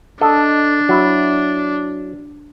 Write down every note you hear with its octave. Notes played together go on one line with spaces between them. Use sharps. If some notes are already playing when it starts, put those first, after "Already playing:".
D4 A4 D#5
F#3 E4